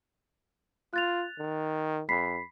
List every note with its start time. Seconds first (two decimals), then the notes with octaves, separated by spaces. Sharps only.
0.94 F4 F#6 A6 F7
1.39 D#3
2.09 F2 B5 B6 C7